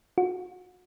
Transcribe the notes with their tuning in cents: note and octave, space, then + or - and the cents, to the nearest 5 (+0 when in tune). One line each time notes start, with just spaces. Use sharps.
F#4 -30